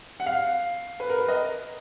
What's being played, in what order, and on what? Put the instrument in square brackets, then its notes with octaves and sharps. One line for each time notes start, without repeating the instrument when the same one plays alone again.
[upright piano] F#5
F5
B4
A#4
B4
D#5